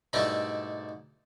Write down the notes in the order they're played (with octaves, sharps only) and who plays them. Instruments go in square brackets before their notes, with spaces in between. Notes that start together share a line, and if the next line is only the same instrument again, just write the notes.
[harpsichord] G#2 B2 G3 A3 D4 E4